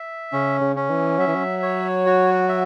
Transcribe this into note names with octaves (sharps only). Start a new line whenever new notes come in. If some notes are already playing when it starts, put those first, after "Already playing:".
Already playing: E5
C#3 C#4
C#3
C#4
E3
F#3 E5
E3
F#3
C#5
F#4
E5